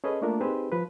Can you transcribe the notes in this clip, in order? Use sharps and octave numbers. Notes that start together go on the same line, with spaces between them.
C#4 G#4 A4 B4 D#5
A3 A#3 D4 F4 A#4
C4 D#4 G4 G#4 B4 C5
F3 B4